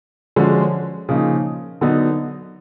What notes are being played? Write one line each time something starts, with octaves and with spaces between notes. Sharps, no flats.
D3 F3 G#3 C#4 F#4
C#3 F3 A#3 D#4
D3 F#3 B3 D#4